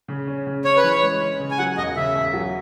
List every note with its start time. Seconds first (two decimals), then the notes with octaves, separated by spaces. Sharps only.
0.08 C#3
0.27 C#4
0.47 C#3
0.65 C#4 C#5
0.77 B4
0.84 E3
0.90 C#5
1.02 G#3
1.21 C#4
1.40 C#3
1.51 G#5
1.58 F#3 F#5
1.77 E1 D#5
1.96 C#3 E5
2.15 E1
2.34 F#3